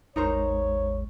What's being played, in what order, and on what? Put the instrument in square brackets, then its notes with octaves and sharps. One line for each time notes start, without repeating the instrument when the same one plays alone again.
[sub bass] A1 [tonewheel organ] E2 G#3 [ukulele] D#4 A#4 C5 [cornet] C#5